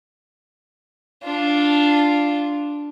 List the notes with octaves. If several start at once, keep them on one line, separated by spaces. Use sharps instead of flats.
D4 F4